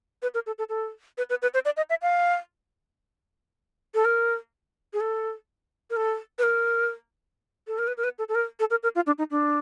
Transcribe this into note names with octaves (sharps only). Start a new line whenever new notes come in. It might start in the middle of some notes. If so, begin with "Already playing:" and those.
B4
A#4
A4
A4
A4
B4
B4
B4
C5
D5
D#5
E5
F5
A4
A#4
G#4
A4
A#4
A4
B4
A#4
A4
A#4
B4
A#4
B4
A4
A4
A#4
A4
A#4
A#4
F4
D4
D#4
D4